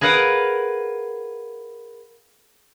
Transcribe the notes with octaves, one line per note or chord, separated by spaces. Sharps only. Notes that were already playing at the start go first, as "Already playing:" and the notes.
G#4 A#4 B4 F5 F#5